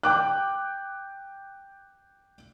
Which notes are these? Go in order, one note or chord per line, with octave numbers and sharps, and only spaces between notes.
G5 D6 F#6